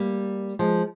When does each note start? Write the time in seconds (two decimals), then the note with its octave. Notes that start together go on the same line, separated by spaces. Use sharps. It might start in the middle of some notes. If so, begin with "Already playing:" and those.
Already playing: G3 A#3
0.59 F3 G#3